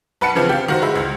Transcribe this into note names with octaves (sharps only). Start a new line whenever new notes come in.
B1 B4 F#5 A5 C#7
C#3 E3 F3 C4
G4 F5
D#3 F#4 C5
G#3 E4
C#2